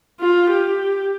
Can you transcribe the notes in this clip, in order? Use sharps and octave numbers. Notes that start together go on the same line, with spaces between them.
F4
G4